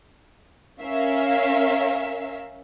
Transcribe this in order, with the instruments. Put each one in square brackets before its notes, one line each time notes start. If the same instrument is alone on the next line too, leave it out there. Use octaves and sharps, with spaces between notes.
[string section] C#4 A#4 E5 F5